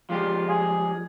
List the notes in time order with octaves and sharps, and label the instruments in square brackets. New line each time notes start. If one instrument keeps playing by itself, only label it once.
[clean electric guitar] F3 G#3 G4 [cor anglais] F4
[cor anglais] G#4